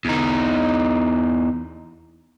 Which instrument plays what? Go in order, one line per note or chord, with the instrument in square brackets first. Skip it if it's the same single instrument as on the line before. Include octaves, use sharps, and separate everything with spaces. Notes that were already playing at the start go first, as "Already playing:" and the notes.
[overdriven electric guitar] E2 D#4